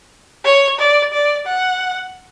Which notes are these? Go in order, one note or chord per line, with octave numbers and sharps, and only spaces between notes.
C#5
D5
D5
F#5